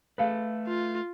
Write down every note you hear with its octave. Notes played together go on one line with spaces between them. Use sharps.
A3 G#4 A4 B4 F5
F4